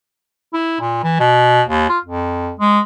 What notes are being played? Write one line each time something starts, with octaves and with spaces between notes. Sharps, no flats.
E4
A#2
E3
B2
D#2
F4
F2
G#3